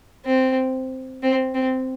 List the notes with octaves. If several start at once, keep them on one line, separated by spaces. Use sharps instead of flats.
C4
C4
C4